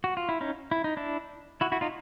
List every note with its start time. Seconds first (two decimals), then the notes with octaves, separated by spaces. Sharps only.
0.04 F#4
0.17 F4
0.29 E4
0.41 C#4 D#4
0.71 E4
0.84 D#4
0.97 D4 E4
1.61 E4 F#4
1.72 E4 F#4
1.81 D#4 F4